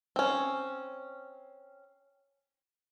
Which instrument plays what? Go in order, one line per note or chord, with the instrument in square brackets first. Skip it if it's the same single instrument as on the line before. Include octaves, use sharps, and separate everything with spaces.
[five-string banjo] C4 C#4